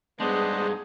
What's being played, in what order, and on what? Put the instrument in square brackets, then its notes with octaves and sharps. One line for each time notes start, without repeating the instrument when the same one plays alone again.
[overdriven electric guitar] G2 G#3 [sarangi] B3 [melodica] D4 C5 D#5 [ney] G#4